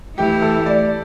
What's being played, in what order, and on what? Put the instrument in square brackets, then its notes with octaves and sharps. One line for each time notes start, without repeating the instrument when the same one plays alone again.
[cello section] E3 A3 E4 [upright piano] G4
[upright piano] A4
D5